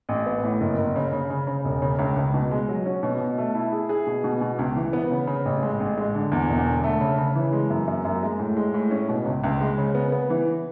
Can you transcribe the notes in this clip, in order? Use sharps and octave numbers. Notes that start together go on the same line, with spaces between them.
A1
B3
A2
F#1
F#1
C#3
C#3
C#3
C#3
E1
C#3
C#2
C#2
B2
G#3
F#3
C#4
B2
B2
A3
E4
G#4
G#4
B2
B2
B2
C#2
E3
B3
C#3
C#3
A1
G#3
A1
G#3
D3
E2
E1
D3
A3
C#3
C#3
E3
G#3
F#2
F#2
F#2
G#3
A2
G#3
A2
C#4
B2
C#2
C#2
G#3
C#3
B3
B3
E3